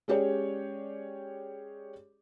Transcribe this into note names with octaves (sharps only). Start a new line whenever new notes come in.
G#3 C#4 G4 G#4 C#5 D5